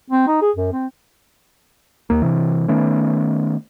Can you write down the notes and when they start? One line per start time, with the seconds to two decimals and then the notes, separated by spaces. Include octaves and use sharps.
0.10 C4
0.27 D#4
0.42 G#4
0.56 F#2
0.73 C4
2.10 D#2 A#3
2.22 C3 E3
2.68 D#3 A3 B3 C#4